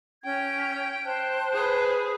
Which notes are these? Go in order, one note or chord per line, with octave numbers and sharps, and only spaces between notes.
C#4 G5 G#6
C5 A5 F#6
G#4 B4